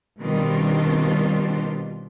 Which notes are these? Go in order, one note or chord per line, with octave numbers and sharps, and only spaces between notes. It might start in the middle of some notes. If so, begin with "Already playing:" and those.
B2 D#3 G3 C4 D4 F4